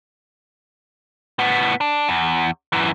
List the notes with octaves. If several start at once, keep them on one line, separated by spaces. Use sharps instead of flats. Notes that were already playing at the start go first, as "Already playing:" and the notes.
A2 B3
D4
E2
F#2 E3